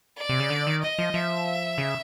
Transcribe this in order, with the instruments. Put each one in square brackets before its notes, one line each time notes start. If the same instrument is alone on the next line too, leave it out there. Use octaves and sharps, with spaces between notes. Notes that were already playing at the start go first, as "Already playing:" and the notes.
[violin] D5
[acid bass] C3
C#3
D3
D#3
[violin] D#5
[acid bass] F3
[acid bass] F3 [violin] E5
[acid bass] C#3